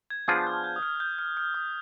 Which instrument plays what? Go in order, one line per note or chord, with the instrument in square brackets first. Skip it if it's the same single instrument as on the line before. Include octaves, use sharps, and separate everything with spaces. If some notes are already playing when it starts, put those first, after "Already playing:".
[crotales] G#6
[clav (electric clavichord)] F3 B3 D4 F4 G#4 [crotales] G6
[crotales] F6
G6
D#6
F6
G6
F6
F6
D#6